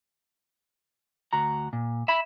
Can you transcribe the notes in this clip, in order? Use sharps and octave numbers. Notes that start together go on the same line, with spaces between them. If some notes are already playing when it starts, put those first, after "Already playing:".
D2 F#4 A#5
A#2
E5 B5